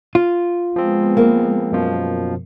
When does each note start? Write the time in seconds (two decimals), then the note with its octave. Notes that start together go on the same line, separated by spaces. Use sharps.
0.15 F4
0.76 F3 G#3 B3 C4
1.17 A#3
1.72 F#2 B2 F3